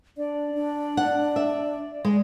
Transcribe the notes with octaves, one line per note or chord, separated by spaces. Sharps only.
D4 D5
D4
F#5
E5
G#3